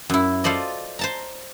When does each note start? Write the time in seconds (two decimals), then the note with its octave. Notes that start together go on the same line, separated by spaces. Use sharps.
0.10 F#2 E4
0.44 F4 A4 C5 D5 D#5
0.99 C5 A5 A#5